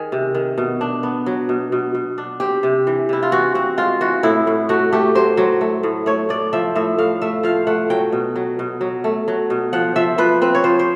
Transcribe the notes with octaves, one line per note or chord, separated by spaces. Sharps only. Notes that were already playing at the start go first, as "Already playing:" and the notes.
Already playing: D#3 G#4
C3
D#3
B2
D4
B3
F#3
B2
B2
B2
D4
C4 G4
C3
E3
C3 E4
F4
E3 F#4
C4 F#4
G#3 F4
E3 F#4
A2 E4
A2
A3 F#4
A3 G4
F#3 C5
F#3
A3
A2
A3 C#5
A2 D5
F3 E5
A2 E5
A2 F5
A3 E5
F3 F5
A3 F#5
F#3 G5
B2
F#3
B2
F#3
A3
F#3
B2
F3 F#5
F3 E5
F3 B4
C4 B4
C#5
F3 C5
C5